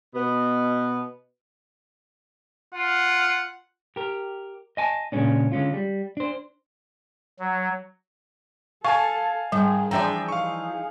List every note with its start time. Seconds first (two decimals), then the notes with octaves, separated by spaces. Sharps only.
0.14 B2 B3
2.75 F4 F#5
3.96 G4 A#4
4.77 D#5 G#5 A5
5.12 A#2 C#3 F#3 G#3 C#4 D4
5.52 D3 G#3 C#4 F4
5.74 G3
6.17 D4 C5
7.39 F#3
8.85 A4 F5 G#5 A5 C#6
9.52 G#2 D#3 G3 G#4
9.91 E3 F3 D4 G#4 D5 E5 G5 A#5
10.28 D#4 G#4 F5 C#6